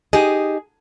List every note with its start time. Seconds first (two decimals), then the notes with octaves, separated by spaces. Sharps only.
0.13 D#4 G4 G#4 D#5